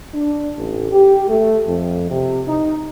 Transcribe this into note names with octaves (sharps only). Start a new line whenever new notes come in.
D4
A1
G4
A3
F2
C3
D#4